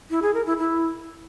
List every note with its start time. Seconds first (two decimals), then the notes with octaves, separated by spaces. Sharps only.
0.10 E4
0.22 G#4
0.34 A#4
0.46 E4
0.58 E4